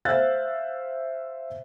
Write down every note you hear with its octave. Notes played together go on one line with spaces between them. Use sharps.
C5 E5 F5 F#6 G6 A6